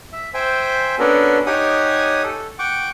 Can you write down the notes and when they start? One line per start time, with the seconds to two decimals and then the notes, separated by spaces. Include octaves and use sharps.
0.12 E5
0.34 C5 E5 G5 G#5
0.99 B3 C#4 D4 F#4 A4 A#4
1.46 D#4 G4 C#5 F#5 G#5 D#6
2.24 A4
2.59 F#5 G5 C#6 D6